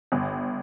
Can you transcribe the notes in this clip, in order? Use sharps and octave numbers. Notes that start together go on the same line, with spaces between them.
G1